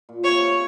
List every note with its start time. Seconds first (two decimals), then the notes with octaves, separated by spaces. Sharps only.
0.09 A#2
0.24 C3 C#5
0.39 C#3